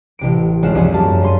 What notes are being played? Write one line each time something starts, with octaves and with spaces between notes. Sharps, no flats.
A1 C3 D7
F#1 G#3 C4 F4 F#5 E7
C2 G#2 F3 C4 G#5
F#2 G3 A#3 A5
G2 C6 D#7